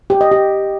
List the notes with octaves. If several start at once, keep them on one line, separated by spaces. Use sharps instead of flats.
G4
D#5
G4